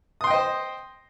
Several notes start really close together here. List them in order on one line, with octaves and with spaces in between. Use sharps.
D#6 C6 G5 D#5 C5